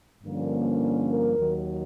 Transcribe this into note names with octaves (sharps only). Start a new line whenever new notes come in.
G2 D3 F3 A#3 C#4
A#4
D#2 D#3 F#3